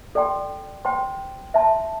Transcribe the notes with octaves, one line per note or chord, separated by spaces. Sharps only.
A4 D5 G5 C6
C5 G5 C6
C5 E5 A5 C6